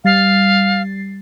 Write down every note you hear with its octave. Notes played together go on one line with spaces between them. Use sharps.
G3 F5 A6 C7